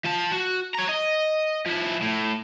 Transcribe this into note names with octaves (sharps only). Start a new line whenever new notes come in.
F3 A5
F#4
C#5 A#5
D#5
F3 E4
A2